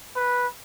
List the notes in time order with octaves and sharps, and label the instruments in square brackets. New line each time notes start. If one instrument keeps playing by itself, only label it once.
[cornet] B4